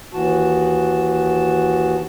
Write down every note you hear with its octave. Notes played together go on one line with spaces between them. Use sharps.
D#2 E3 F#4 A5